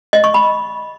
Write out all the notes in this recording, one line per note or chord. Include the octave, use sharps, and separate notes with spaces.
D#5
C#6
B5